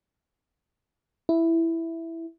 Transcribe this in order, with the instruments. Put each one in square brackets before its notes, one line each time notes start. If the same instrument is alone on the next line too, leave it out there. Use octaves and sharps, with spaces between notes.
[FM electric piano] E4